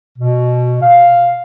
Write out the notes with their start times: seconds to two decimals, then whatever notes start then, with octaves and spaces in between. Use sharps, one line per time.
0.18 B2
0.83 F5